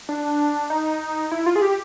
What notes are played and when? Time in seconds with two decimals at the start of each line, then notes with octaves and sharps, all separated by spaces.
0.09 D4
0.70 D#4
1.31 E4
1.46 F4
1.56 G#4
1.61 G4